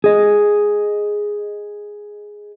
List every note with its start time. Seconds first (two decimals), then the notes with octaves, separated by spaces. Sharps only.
0.04 G#4 D#5